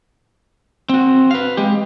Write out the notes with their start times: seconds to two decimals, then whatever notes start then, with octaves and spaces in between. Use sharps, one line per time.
0.89 C4 F#4
1.31 B4 F5
1.57 G#3 G4